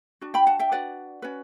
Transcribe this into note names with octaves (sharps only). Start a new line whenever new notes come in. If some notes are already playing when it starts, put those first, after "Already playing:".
D4 F#4
G5 B5
F#5 A5
E5 G5
D4 F#4 B4 D5 F#5
C#4 F#4 B4